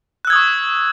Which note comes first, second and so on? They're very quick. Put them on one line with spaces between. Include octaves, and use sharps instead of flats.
F#6 E6 G#6 D#6 C#6